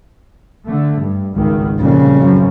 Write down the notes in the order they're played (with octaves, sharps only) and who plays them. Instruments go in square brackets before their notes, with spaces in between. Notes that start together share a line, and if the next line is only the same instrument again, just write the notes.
[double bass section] D3 A3
G2
G#1 C#2 D#3
[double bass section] F2 A#2 G3 [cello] C#3
[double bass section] F#2 F3